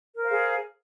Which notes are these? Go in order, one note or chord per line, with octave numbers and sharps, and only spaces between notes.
G#4 A#4 C5 F5